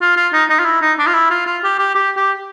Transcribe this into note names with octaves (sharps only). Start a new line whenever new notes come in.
F4
F4
D#4
D#4
F4
E4
D#4
D4
F4
E4
F4
F4
G4
G4
G4
G4